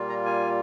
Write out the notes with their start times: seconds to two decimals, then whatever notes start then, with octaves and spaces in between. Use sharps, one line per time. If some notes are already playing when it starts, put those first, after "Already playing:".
Already playing: A#2 G3 A#3 F4
0.09 A#5
0.25 G#5